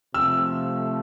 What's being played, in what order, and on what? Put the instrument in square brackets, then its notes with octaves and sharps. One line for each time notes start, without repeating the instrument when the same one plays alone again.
[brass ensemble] C3 F3 A3 [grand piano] E6